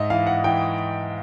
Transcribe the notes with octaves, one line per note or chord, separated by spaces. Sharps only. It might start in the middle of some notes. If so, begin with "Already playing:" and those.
Already playing: G#2 D#5 E5
E3 F5
F#5
E3 G5